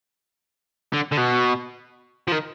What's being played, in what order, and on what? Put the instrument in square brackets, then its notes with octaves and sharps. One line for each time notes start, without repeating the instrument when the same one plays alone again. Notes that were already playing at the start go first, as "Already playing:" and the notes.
[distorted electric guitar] D3
D3
B2
F3
D#3